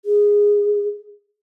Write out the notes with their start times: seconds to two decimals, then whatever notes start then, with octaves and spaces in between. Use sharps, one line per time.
0.05 G#4